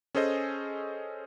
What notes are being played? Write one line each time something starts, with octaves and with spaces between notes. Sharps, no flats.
C#4 G#4 A4 C5 D#5